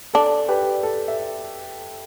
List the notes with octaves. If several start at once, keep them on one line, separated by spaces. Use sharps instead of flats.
D4 A4
G4 B4
A4
E5